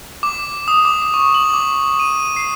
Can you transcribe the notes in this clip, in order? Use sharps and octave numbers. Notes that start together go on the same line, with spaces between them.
D6
D#6
D6
C#6
F#7
D6
D#7
C7